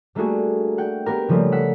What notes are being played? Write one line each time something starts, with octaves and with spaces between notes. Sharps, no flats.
G3 A3 A#3 D4 F#4 G#4
F#5 G5
B3 G4 A#4
C#3 F3 G3 A3 A#3
F#5 E6 B6